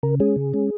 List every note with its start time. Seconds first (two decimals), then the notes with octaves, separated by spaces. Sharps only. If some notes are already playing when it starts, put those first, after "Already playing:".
0.03 C#3 A#4
0.20 G#3 C#4 G#4
0.36 C#3
0.54 G#3 C#4